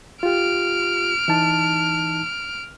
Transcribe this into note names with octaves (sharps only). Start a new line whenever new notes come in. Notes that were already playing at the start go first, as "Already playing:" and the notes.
F4 G4 F6 D7
E3 D#4 A5